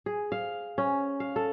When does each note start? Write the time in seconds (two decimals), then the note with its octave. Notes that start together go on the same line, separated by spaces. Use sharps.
0.06 G#4
0.32 F5
0.78 C#4
1.20 F5
1.36 A4